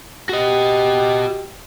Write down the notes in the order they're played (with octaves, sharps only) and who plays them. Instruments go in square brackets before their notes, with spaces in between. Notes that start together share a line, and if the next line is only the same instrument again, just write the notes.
[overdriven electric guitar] F#4 D#5 [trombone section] G4